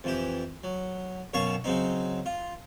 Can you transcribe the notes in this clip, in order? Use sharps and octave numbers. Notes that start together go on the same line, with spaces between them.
F2 E3 G4
F#3
F#2 B2 C#5 F5 A5 C#6
C#3 F#3 C4 D#4
F4